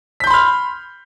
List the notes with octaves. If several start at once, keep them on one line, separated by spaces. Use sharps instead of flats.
B5 C6 F6 G6 B6